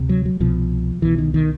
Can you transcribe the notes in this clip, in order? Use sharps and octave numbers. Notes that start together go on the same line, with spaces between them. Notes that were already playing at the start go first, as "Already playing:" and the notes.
Already playing: D2 C3
F#3
F#3
C2 B2 F3
C2 B2 E3
D#3
D#3